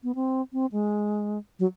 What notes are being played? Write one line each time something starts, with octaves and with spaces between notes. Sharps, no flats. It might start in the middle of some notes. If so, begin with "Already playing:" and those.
B3
C4
C4
G#3
F#3